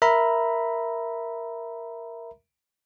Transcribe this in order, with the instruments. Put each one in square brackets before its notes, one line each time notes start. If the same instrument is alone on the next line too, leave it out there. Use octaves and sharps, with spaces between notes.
[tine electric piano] A#4 E5 A#5 B5